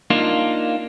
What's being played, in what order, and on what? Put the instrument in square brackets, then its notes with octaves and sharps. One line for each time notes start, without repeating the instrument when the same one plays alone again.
[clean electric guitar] A#3 D4 D#4 F4